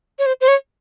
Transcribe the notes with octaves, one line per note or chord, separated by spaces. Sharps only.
C#5
C5
C5
C#5